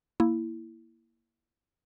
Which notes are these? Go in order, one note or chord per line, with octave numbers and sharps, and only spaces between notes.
A#3 E4